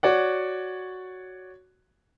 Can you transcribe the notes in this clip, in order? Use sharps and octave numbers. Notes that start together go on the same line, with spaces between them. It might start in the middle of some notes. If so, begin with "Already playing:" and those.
F#4 C#5 D5 F#5